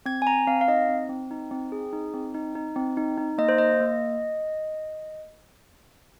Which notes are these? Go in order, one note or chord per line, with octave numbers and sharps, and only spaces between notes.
C4 G#6
G#5
C4 A#5
C4 F5
F5
D#4 D#5
C4
C4
D#4
C4
G#4
D#4
C4
D#4
D#4
C4
D#4
D#4
A#3 D#5
C5
A#3 D#5
A#3